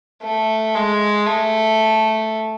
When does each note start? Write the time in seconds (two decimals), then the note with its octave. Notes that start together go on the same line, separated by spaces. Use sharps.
0.23 A3
0.75 G#3
1.27 A3